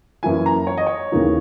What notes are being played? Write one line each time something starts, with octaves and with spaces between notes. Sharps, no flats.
F#2 E3 A#3 E4 G#5
A#5
C#5
D#5
C#5
D#2 C#3 E3 A#3 D#4